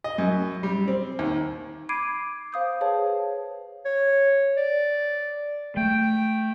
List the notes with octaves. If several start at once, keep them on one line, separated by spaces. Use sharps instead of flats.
D#5
F#2
G3
C4
D#2
B5 D6 G#6 C7 D7 D#7
C5 F5 D#6 G6
G#4 B4 C#5 F5 A5
C#5
D5
A3 G5